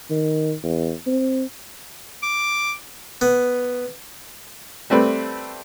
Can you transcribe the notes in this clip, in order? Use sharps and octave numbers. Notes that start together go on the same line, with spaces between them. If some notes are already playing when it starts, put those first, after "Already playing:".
D#3
E2
C4
D6
B3
G3 A3 C4 B4